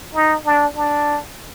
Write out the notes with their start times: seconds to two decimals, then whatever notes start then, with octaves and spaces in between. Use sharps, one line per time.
0.15 D#4
0.46 D4
0.76 D4